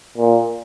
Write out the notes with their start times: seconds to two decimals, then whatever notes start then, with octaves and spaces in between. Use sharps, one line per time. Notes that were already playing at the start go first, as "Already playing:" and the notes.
0.17 A#2